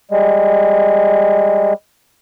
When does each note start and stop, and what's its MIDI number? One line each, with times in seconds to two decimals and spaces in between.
0.11 1.73 55
0.11 1.73 56